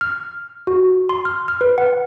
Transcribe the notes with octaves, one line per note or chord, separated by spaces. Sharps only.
F6
F#4
C6
F6
F6
B4
F#5